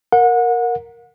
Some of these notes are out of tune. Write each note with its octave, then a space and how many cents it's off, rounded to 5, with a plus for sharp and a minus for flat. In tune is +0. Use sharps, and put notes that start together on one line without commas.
A#4 +0 F#5 -30